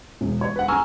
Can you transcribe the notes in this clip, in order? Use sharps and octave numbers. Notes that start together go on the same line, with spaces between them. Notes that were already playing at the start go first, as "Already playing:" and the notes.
E1
C#5
B4 F#5
G#5 A#5 C#6 E6 F6